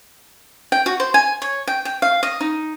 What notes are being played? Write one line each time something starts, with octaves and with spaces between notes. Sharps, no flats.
G5
F#4
C5
G#5
C#5
G5
G5
F5
D#5
D#4